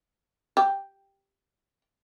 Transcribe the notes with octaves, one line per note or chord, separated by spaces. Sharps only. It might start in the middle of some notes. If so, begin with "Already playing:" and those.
G4